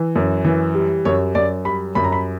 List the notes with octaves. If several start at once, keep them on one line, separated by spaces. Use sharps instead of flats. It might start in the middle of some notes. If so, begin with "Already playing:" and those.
Already playing: E3
F#2
E3
G3
F#2 C#5
F#2 D5
G3 B5
F#2 B5
A#5
B5